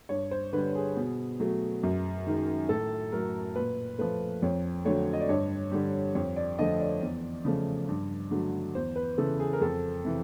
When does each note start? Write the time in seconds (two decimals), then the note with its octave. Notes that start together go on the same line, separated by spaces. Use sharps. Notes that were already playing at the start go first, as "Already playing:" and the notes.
0.09 G2 C#5
0.31 C5
0.53 D3 G3 B4
0.75 G#4
0.97 B2
1.40 F#3 A3
1.83 F#2
2.27 D#3 G#3
2.69 A2 A4
3.12 F#3 A3 A#4
3.55 A#2 B4
3.98 F3 A3 B4
4.42 F2 C#5
4.85 D3 F#3 A3 C#5
5.13 D#5
5.20 D5
5.29 G2 C#5
5.71 D3 G3
6.15 F2 C#5
6.36 D5
6.59 D3 F3 A3 D#5
6.80 D5
7.01 E2
7.45 C#3 F3 A3
7.89 G2
8.31 D3 F#3 A3
8.75 E2 C5
8.96 B4
9.18 C#3 E3 A4
9.39 G#4
9.53 A#4
9.61 F2 A4
10.04 C3 E3